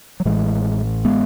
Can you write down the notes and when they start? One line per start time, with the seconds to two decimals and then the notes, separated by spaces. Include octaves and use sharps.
0.20 F#3
0.25 A1 A2 E3 G#3
1.05 G#3 B3